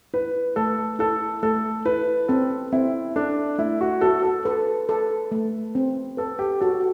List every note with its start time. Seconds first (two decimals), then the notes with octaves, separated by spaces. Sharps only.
0.14 E4 B4
0.56 A3 A4
0.99 E4 A4
1.43 A3 A4
1.85 E4 B4
2.28 C4 A4
2.73 C4 E4
3.16 D4 A4
3.58 A3 E4
3.81 F#4
4.01 F#4 A4
4.23 A4
4.45 A4 B4
4.89 A4
5.32 A3
5.75 C4
6.17 A4 B4
6.39 G4
6.61 F#4 A4